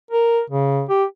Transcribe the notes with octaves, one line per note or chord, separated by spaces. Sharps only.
A#4
C#3
G4